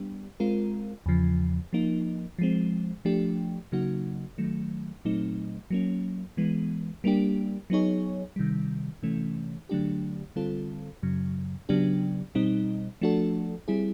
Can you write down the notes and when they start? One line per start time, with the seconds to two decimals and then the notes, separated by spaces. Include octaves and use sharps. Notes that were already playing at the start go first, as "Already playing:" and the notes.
Already playing: G3 B3 D4 G4
0.40 G#3 C4 F4 A#4
1.06 E2 C#3 F3
1.73 F3 A#3 D#4
2.39 F3 G#3 C4
3.05 F3 A3 D4 G4
3.72 C#3 F#3 A#3 D#4 F#4
4.38 D#3 F#3 A3
5.05 A#2 F#3 A3 C4 D#4
5.71 F#3 A#3 C#4
6.37 E3 G#3 B3
7.04 G3 A#3 D4 G4
7.70 F#3 B3 D#4 G#4 C#5
8.36 C3 D#3 G3
9.03 C3 E3 A3 C#4
9.69 D3 F#3 A3 D4 G4
10.36 D3 G3 C4 F4 A4
11.03 F#2 C#3 F#3
11.69 C#3 F#3 B3 D4 G4
12.35 B2 G3 C4 D#4
13.01 F3 A3 D4 F#4 A4
13.68 G3 C4 E4 G#4